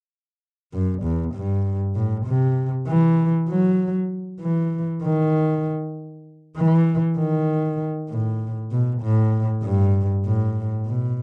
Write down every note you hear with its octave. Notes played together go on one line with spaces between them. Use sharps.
F#2
E2
G2
A2
C3
E3
F#3
E3
D#3
E3
D#3
A2
B2
A2
G2
A2
B2